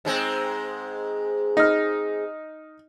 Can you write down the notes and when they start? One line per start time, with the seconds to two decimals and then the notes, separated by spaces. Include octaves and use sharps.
0.05 G#2 G#3 C4
1.57 D#4 F6